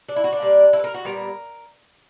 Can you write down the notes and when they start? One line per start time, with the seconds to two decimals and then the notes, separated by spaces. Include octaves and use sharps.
0.08 D4
0.16 E4
0.24 F#4
0.33 D4
0.41 A#2 G3 A#3
0.73 E4
0.79 B4
0.84 A#4
0.94 F#4
1.05 A#2 G3 B3 A#4